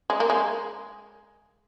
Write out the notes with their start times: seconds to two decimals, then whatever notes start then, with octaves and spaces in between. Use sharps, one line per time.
0.10 G#3
0.20 A#3
0.30 G#3